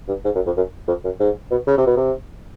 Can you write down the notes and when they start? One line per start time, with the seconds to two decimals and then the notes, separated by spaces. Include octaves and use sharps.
0.08 G2
0.25 G#2
0.35 F#2
0.46 F2
0.57 F#2
0.88 F2
1.05 F#2
1.20 G#2
1.51 B2
1.67 C#3
1.77 C3
1.87 B2
1.97 C3